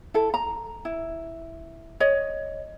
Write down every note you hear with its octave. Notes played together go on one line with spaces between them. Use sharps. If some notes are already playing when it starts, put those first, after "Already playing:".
E4 A4
A#5
E4
C#5 D#5